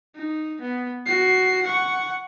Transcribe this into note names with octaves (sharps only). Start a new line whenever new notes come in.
D#4
B3
F#4 C7
F#5 C#6